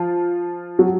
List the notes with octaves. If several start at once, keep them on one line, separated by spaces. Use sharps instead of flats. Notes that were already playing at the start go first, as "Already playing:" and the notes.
Already playing: F3 F4
F#3 F#4